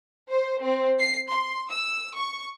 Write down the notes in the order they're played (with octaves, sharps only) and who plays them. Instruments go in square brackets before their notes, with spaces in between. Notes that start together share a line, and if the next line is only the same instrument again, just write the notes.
[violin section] C5
C4
C7
C6
E6
C#6